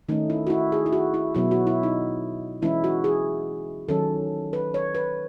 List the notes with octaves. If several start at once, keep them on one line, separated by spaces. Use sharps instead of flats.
D#3 A3 C#4 D#4
E4
F#4
E4
G#4
E4
F#4
E4
B2 F#3 B3 E4
F#4
E4
D#4
E3 G#3 C#4 E4
F#4
G#4
D#3 F#3 C#4 A4
B4
C#5
B4